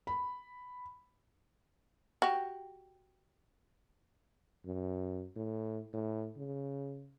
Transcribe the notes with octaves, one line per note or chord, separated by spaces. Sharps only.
B5
F#4 G4
F#2
A2
A2
C#3